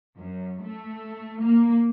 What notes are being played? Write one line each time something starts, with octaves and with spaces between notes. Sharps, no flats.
F#2
A3
A#3